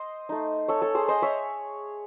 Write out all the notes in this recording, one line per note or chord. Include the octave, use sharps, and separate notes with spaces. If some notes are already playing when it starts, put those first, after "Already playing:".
Already playing: C5 D#5
A3 D#4
A4 C#5
A4 C#5
G#4 C5
C5 D#5
C#5 E5